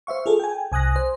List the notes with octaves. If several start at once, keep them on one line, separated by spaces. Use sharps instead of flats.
C5 E5 F5 C#6
F4 G#4 A4
G5 G#5
C2 G#5 D#6 F#6 A#6
C5